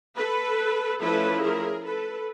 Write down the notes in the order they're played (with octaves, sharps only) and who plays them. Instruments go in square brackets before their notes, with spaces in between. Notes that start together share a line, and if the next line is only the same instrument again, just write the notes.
[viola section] A4 B4
F3 A3 C#4 E4 A4 B4
G#4 A#4
A4 B4